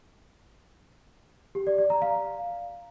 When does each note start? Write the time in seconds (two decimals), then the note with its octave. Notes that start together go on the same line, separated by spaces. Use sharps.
1.55 G4
1.67 D5
1.78 D5
1.90 A#5
2.02 F5